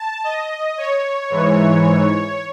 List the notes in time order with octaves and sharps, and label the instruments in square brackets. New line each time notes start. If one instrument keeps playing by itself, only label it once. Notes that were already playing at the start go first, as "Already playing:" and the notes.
Already playing: [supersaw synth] A5
D#5
C#5
G#2 E3